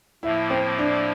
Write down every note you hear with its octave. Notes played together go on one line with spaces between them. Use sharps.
A2 F3 A#3 E4
C4
D4